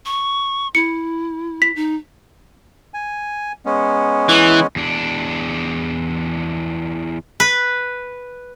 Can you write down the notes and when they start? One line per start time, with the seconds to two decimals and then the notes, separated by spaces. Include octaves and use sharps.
0.06 C#6
0.75 E4 C#7
1.62 B6
1.76 D#4
2.94 G#5
3.66 G#3 B3 C#4
4.29 E3
4.76 E2 D4
7.40 B4